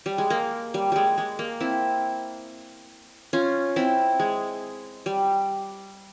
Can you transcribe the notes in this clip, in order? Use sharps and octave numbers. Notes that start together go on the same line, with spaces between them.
G3
G#3
A#3
G3
G3 G#3
G#3
A#3
C4 E4
C#4 F4
C4 E4
G#3
G3